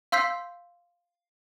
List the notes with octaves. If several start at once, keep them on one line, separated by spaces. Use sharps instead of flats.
F5 C6 E6 G6 B6 C7